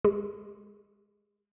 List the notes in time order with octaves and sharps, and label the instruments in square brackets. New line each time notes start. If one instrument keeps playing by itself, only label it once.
[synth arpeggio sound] G#3